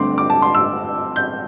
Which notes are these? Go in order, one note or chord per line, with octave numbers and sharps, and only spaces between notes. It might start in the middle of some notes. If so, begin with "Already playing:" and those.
Already playing: G2 D3 A3 C4 C6 D6
D6
A5
C6
E6
G6